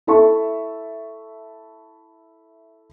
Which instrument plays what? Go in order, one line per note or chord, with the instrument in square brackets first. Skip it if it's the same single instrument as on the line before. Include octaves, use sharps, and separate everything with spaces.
[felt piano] E4 A4 E5 A5 C#6